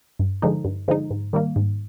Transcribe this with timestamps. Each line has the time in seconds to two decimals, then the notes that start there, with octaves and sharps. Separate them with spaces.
0.19 G2
0.42 D3 F3 G#3 D#4
0.65 G2
0.88 D3 F3 G#3 D#4
1.11 G#2
1.33 D#3 G3 A#3
1.56 G#2